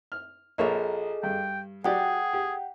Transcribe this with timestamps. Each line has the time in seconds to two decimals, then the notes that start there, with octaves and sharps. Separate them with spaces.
0.12 F6
0.58 A#1 A#3 G#4 A4 C#5 D#5
1.23 G2 G5
1.84 F#3 G4 G#4 D5 F#5 G5
2.33 G4